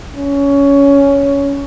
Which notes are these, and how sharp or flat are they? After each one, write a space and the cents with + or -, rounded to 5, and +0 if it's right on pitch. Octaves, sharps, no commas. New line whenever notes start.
C#4 +15